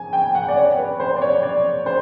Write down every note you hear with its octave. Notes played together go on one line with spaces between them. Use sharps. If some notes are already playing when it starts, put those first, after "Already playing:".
Already playing: G#5
G5
F#5
D5
C#5
B4
C5
D5
C#5
D5
C5